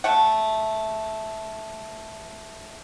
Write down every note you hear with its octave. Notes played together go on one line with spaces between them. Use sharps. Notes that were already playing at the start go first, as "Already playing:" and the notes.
A3 F#5